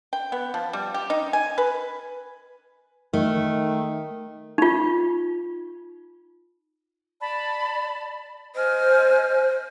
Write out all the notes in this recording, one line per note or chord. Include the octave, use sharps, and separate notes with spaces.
G5
B3
F3
G3
G4
D#4
G#5
B4
D#3 A3
D#4 F4
D5 A5 B5
C5 D#5 G#5 F6